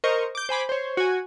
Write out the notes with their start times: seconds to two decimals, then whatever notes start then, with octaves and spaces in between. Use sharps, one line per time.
0.04 A#4 C5 D#5 C#6
0.35 D6 G6
0.49 C5 G#5 B5 D6
0.69 C5 C#5
0.97 F#4 G#5